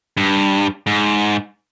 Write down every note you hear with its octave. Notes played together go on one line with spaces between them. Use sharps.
G2
G#2